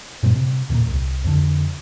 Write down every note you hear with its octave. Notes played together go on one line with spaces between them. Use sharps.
F#2 A#2 G3 C4
C3
D#2 A#2 A#3
C2
F2 D3